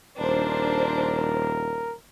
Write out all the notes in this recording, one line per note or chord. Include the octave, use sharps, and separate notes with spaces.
D#1 D4 A#4 C5